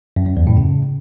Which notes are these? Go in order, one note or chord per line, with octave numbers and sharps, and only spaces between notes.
F#2
F#2
E2
A2
C#3